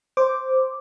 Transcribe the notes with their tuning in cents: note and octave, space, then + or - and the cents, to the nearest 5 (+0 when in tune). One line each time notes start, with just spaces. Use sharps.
C5 +0 D6 +0